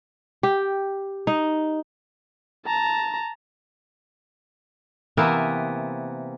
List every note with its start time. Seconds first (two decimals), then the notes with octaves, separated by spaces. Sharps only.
0.43 G4
1.27 D#4
2.66 A5 A#5
5.17 C3 E3 A#3 B3 A#4 E5